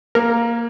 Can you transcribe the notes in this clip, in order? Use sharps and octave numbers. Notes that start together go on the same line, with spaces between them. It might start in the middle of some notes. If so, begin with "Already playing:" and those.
A#3 A#4